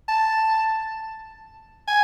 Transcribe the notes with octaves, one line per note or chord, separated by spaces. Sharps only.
A5
G#5